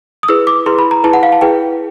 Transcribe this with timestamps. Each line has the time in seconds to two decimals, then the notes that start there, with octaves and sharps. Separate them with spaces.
0.23 D#6
0.28 E4 G#4 B4 E6
0.47 D6
0.66 E4 G#4 B4 C6
0.79 B5
0.91 A#5
1.04 E4 G#4 B4 A5
1.13 F#5
1.23 F5
1.32 A5
1.41 E4 G#4 B4 G5